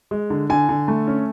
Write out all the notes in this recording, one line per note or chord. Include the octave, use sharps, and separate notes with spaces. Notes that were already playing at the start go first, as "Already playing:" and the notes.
G#3
D3
D3 G#5
D3
A3
C#4